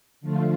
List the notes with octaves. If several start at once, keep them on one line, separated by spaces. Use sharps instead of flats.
D3 F3 A3 F4